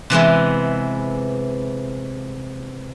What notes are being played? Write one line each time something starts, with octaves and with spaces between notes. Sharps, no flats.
C3 E3 G#3 B3